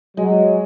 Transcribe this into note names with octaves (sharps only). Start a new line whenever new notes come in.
F#3 G#3